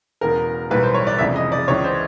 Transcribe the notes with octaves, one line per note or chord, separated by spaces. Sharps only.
E1 E2 C#3 A#4
B1 A2 E3 G3 B4
C5
C#5
D5
F1 F2 C#3 E3 G#3 E5
D#5
D5
C#2 C#3 E3 C#5
C5